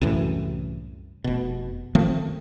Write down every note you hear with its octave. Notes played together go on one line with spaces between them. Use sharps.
C2 F#2 A2 E3
F1 B2
D#3 F3 A3 C4